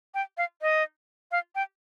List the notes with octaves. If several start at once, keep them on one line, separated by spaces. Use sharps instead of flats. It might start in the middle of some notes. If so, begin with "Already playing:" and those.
G5
F5
D#5
F5
G5